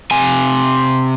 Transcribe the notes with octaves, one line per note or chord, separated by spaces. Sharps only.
C3 G#5